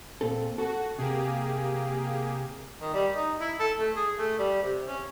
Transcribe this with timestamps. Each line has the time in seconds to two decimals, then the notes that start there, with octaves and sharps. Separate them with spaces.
0.21 A#2 C4 A4
0.58 F#4 A4
0.99 C3 A#3 G4 G#4
2.82 D#3
2.94 G3
3.16 D#4
3.41 E4
3.60 A4
3.79 A3
3.96 G#4
4.19 A3
4.39 G3
4.63 C3
4.88 C#4